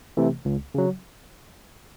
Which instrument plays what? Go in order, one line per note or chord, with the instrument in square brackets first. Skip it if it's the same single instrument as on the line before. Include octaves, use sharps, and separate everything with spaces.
[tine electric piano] C3 E3 A3
C#2
C#3 F#3